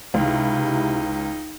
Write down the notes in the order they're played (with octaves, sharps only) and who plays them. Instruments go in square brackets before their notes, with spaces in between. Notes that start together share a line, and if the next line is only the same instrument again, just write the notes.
[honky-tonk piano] C#2 [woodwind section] C3 E4 [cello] D#4